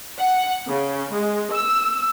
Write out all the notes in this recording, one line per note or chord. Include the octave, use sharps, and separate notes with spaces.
F#5
C#3
G#3
E6